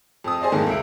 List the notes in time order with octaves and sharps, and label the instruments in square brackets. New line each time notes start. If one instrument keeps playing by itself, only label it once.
[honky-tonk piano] F2 D#6
G#4 C5 D5 D#5
F2 G#2 D#3 A3 A#3
C#2 E5 D7